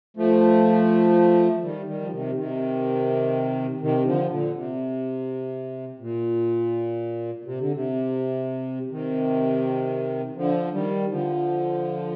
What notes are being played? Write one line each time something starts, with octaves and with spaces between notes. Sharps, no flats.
F3 A3
D#3 G3
D#3 G3
F3
C3 D#3
C3 D#3
C3 D#3
D3 F3
A#2 D3
C3
A#2
C3
D3
C3
C3 D#3
D3 F3
D#3 G3
D3 F3